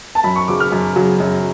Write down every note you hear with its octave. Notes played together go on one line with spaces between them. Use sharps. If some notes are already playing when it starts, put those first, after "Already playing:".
A5
F#2 B5
C#6
C#3 F#3 D6
F6
F#2
C#3 F#3
F#2